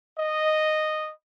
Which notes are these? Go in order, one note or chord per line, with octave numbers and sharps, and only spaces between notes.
D#5